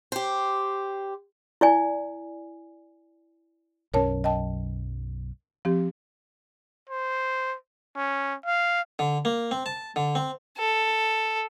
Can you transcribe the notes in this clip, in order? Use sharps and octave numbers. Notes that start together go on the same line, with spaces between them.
G4 C5
E4 D5 G#5
B1 F#2 C#4 A#4 C#5 A5
D#5 G5 A5
F3 C4 G4
C5
C#4
F5
D3
A#3
C4
A5
D3
C4
A4